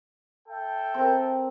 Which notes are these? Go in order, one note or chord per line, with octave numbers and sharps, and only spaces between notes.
A4 E5 G5
C4 A#4